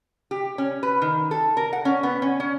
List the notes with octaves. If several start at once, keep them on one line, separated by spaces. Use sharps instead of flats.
G4
C#4
B4
D#3
A4
A#4
F#5
C#4
B3
C#4
C#4